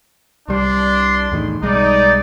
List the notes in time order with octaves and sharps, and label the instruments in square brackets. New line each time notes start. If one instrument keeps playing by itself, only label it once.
[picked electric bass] C2 G3 [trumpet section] D4 C6
[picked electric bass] E2 A2 D#3
[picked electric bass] B1 G3 G#3 [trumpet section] D#4 D5